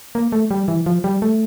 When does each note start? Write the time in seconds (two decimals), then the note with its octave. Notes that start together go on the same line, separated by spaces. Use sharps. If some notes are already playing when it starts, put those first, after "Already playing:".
0.15 A#3
0.32 A3
0.51 G3
0.68 E3
0.86 F3
1.04 G3
1.22 A3